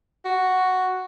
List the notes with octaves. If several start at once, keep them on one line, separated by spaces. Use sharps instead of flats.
F#4